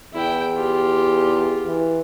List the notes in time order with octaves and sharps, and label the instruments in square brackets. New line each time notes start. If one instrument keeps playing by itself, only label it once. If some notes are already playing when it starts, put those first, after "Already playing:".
[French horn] E2 [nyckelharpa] E4 G5
[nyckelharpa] F4 G4
[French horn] E3